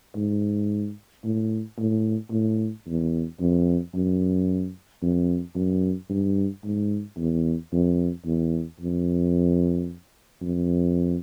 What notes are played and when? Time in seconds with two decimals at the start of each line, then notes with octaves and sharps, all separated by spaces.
0.16 G#2
1.24 A2
1.79 A2
2.32 A2
2.87 E2
3.41 F2
3.95 F#2
5.03 F2
5.55 F#2
6.09 G2
6.64 G#2
7.17 E2
7.72 F2
8.25 E2
8.80 F2
10.42 F2